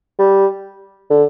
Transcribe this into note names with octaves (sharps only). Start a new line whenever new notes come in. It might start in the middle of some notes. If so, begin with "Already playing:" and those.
G3
D3